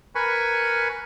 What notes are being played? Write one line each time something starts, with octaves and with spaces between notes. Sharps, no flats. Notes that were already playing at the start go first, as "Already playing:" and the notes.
A#4 B4 G#5 B5 C#6